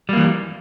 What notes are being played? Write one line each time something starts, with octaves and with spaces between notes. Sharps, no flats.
E3 G3 A#3